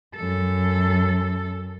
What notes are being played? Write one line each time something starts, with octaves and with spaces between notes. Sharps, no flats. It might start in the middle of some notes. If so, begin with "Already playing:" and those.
F#2 A4